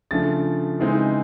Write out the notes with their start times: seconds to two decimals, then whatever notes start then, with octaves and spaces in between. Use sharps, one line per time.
0.11 C#3 F3 A3 D4 A6
0.79 C#3 E3 G#3 C4 D#4